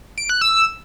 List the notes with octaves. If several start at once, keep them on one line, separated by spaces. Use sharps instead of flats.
D7
F#6
E6